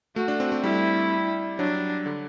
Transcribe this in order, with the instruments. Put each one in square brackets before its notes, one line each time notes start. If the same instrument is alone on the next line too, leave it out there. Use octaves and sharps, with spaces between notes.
[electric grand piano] A3 [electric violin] F#4
[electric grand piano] D4
C4
A3
[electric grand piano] G3 [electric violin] E4
[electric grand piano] F#3 [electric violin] D4
[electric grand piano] D3